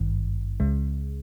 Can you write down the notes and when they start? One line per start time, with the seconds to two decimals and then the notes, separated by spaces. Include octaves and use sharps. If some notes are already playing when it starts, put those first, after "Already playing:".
Already playing: G#1 G2 D#3
0.60 C#2 C#3 G#3